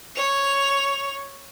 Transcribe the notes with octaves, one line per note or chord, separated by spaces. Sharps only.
C#5 F7